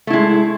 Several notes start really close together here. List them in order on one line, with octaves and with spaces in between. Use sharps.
A3 E4 G#3